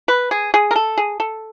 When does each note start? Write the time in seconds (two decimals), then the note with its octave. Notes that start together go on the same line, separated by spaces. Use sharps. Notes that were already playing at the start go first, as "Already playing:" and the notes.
0.08 B4
0.31 G#4
0.54 G#4
0.71 A#4
0.76 A4
0.98 G#4
1.20 A4